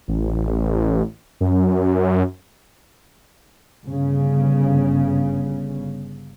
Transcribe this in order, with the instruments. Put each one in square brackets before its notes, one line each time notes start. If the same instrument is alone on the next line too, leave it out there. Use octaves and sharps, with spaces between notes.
[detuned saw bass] A1
F#2
[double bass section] G1 C#3